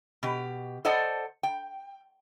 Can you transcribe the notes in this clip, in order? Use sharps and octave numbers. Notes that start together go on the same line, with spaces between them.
B2 G4
A4 C5 D5 D#5 F#5 A5
G5